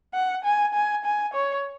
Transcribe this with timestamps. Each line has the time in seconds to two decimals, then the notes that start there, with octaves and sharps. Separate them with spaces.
0.14 F#5
0.44 G#5
0.74 G#5
1.05 G#5
1.34 C#5